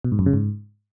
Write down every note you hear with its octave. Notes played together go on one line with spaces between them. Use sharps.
B2
G#2
F#2
C#3
G#2